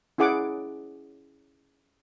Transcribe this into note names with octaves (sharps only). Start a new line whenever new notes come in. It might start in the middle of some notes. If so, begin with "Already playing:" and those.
C#4 E4 G#4 F#5 D6